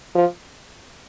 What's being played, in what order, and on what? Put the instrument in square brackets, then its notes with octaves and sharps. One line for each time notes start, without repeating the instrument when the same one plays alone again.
[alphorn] F3